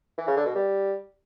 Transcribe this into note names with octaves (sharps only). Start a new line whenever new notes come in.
E3
C#3
D3
B2
G3